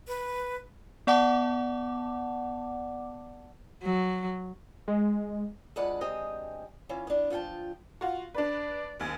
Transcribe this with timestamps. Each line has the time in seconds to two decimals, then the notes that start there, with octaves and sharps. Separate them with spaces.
0.08 B4
1.07 B3 D5 F#5 A5 D6
3.83 F#3
4.88 G#3
5.76 D2 F3 G#3 B4 D5 F#5
6.01 D2 G#3 C4 G4 D#5 G#5
6.89 E3 C#4 F4
7.07 B3 D4
7.30 F3 F4 F#5 G5 A5
8.01 F4 F#4
8.35 D4 B4 D5
9.00 F#1 D#2 G#5